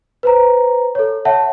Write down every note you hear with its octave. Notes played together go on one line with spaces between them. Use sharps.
B4 C5 A#5
A4 C#5
C#5 E5 F#5 A5